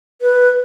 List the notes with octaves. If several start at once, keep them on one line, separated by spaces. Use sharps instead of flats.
B4